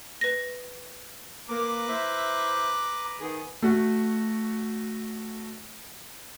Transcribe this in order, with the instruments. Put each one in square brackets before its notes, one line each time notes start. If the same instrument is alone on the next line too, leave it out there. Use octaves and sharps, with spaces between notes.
[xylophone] B4 A#6
[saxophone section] A#3 [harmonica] B4 A#5 D6
[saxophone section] E4 C5 E5
D#3 B3 G#4
[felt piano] A3 F#4